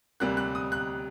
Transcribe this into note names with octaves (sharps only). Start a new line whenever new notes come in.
D2 C3 G3 A#3 F#6
F#6
D#6
F#6